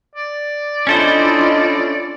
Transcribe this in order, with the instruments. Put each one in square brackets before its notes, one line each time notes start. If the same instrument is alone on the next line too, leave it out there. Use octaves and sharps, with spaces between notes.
[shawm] D5
[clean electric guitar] C#4 A4 C5 [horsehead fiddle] D4 F4 [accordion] E4 D#5